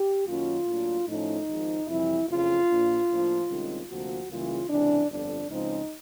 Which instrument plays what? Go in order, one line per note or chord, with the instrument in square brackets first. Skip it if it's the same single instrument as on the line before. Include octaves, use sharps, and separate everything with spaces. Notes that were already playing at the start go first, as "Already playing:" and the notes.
Already playing: [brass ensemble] G4
F#2 D#3 F#3 A#3 C#4 F4
A2 F#3 A#3 D4
A2 F3 A3 C#4 D#4
G#1 G#2 F3
F2 C3 E3 G3 E4
F#1 F2 C#3 F4
A#1 A#2 F3 A#3 D4
A2 F3 A#3 D4
C2 C3 D#3 G#3 C#4
D2 C3 F3 A#3 F#4
C#2 C#3 E3 G3 A#3 F4
C#2 C3 E3 D4
G1 F2 D3 D4
C#2 C#3 F3 G#3 C4 D#4